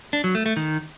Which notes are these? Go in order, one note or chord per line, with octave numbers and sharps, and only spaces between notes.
D4
F#3
A3
A3
D#3